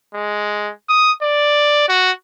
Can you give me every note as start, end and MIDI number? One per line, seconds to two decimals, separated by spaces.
0.14 0.71 56
0.89 1.12 87
1.22 1.87 74
1.89 2.11 66